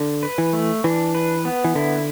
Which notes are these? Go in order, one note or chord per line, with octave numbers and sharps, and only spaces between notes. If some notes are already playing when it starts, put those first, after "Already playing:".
Already playing: D3
B4
E3
A3
E3 D4
B4
B3
E3
D3 E4